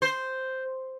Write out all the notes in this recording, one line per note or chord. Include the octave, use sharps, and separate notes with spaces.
C5